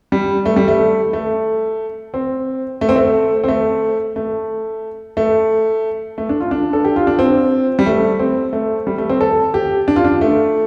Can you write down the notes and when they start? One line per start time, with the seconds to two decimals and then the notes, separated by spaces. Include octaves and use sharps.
0.12 G3
0.46 A3
0.56 G3
0.68 A3
1.13 A3
2.14 C4
2.81 A3
2.89 C4
2.96 A3
3.44 C4
3.48 A3
4.16 A3
5.17 A3
6.18 A3
6.29 D4
6.40 F4
6.51 D4
6.73 A4
6.85 G4
6.96 F4
7.07 D4
7.19 C4
7.79 G3
7.86 A3
8.19 C4
8.53 A3
8.87 G3
8.98 A3
9.09 C4
9.21 A4
9.54 G4
9.88 D4
9.96 F4
10.04 D4
10.21 A3